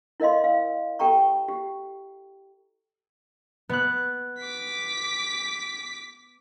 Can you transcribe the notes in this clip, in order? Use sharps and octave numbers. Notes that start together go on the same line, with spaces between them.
E4 A#4 D#5 F5 C6
F5
G4 A4 G5 A5 A#5 C#6
G4
B3 F#6
D6 B6